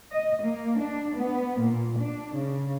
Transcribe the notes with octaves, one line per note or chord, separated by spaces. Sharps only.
D#5
A#3
D4
B3
A#2
D4
C#3